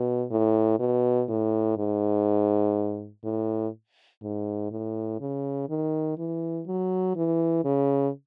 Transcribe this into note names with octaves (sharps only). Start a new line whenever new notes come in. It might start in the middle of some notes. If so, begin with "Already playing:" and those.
Already playing: B2
A2
B2
A2
G#2
A2
G#2
A2
C#3
D#3
E3
F#3
E3
C#3